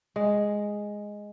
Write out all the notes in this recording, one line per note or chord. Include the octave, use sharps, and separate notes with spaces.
G#3